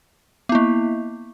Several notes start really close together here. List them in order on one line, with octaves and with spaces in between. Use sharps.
B3 E4 A#3